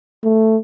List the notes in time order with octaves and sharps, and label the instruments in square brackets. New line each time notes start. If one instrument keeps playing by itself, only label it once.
[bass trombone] A3